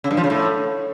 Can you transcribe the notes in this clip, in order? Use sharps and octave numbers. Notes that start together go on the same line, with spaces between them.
C#3
G2
F3
C#3
A2